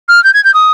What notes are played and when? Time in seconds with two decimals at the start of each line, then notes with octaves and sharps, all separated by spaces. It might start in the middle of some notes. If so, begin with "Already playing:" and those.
0.08 F6
0.24 G6
0.34 G#6
0.44 G6
0.54 D#6